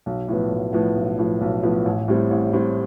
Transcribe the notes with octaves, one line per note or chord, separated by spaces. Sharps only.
B1
A2 F3 B3
B1
A2 F3 B3
B1
A2 F3 B3
B1
A2 F3 B3
A1
A2 G3 C4
A1
A2 G3 C4